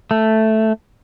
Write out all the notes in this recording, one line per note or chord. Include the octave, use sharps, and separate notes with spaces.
A3